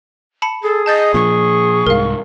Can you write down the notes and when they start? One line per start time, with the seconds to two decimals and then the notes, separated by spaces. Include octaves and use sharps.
0.42 A5 B5 C#7
0.64 G#4 A4
0.86 D#5 A5 G6 A6
1.14 A#2 F3 C#6
1.87 C2 G#2 A#4 F5